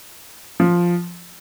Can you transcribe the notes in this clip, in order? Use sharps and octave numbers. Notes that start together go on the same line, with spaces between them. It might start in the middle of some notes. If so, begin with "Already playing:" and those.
F3